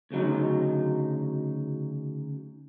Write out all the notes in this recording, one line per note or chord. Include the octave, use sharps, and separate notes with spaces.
D2 C#3 F#3 D#4